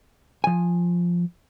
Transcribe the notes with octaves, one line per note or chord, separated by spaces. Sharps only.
F3 G#5